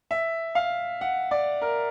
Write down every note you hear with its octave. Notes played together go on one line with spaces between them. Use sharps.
E5
F5
F#5
D5
A#4